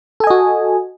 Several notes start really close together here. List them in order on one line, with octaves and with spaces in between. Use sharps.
A4 G#5 D#5 F#4